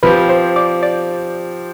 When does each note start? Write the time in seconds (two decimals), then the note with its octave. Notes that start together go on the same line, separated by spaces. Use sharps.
0.03 F3 C4 G4 B4
0.29 C5
0.56 D5
0.83 D5